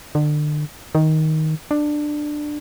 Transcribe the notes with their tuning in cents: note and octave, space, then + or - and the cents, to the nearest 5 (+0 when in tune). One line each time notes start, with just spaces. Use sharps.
D3 +35
D#3 +10
D4 +15